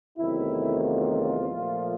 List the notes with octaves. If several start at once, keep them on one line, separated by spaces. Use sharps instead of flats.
E2 C3 D#3 F#3 A3 E4
F4
A#2 F3 A3